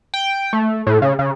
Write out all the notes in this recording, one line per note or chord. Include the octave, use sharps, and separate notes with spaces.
G5
A3
A2
C#3
C#3